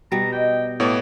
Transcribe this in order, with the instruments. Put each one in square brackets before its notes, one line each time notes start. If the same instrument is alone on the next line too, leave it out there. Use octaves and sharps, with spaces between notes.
[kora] B2 G3 [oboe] A#5
[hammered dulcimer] D5 D#5 [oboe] G5
[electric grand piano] A2 B3 C#5 [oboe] D6